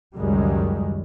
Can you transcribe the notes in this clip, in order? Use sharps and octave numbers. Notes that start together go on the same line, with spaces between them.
C#2 F#2 D#3 G3 G#3